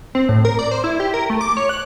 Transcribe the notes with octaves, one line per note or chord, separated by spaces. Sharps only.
C4
A2
A#4
D5
C5
E4
G4
A#4
A3
D6
C#5
F#6